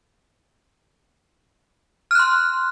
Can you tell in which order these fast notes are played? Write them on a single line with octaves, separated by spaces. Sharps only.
F6 F#6 C6